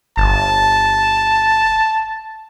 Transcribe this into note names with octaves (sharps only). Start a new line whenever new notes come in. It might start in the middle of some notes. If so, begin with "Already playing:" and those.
G1 A5